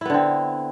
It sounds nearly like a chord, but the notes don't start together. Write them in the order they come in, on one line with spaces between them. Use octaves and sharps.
E4 B3 D3 C4